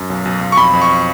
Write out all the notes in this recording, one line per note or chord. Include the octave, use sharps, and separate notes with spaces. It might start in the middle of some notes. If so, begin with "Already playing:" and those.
Already playing: F#2
B1
B1
B1
C#6
F2 B5
F2
C#6